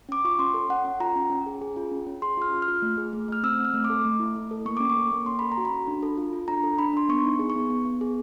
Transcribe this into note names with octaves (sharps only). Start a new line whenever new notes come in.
C#4 D6
F4 C#6
C#4 C6
A4
C#4 F#5
C#4
F4 A#5
C#4
C#4
G#4
G#4
F4
C#4
C#4
G#4 C6
F4 F6
F4
F6
F4
A3
G#4
A3
A3 F6
C4 E6
C4
F6
A3
D6
A4
A3
E4
A3
A4
A#3 C#6
C#4 D6
C#6
A4
A#3
C#4 C6
A4 B5
A#5
F#4
B5
F#4
D4
A4
F4
F4
D4 A#5
A4
D4 B5
D4 C6
B3 C#6
D#4
G#4
C#6
B3
B3
B3
G#4